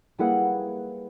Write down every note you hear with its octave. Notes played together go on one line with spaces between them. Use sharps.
G3 A#3 E4 G#4 B4 F#5